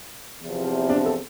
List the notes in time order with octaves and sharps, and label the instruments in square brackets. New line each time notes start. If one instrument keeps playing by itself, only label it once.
[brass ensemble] E2 C3 F3
[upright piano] D4
A4